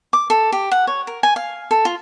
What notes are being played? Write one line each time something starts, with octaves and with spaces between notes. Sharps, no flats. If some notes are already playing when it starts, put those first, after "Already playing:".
D6
A4
G4
F#5
C#5
A#4
G#5
F5
A4
F4